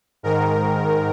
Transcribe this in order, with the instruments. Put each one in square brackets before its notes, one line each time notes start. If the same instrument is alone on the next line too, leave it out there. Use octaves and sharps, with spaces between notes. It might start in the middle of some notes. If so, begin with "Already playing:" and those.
[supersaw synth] G#2 D#3 A#4